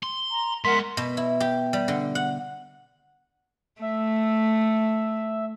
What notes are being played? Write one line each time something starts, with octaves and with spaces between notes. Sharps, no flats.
C6
A#5
G#3 A#4 E5 F#5 C6 B6
B2
E4
G4
G3
D3
F#5
A3 E5